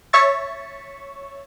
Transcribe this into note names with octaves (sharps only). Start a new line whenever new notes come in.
C#5 E5 C#6 A6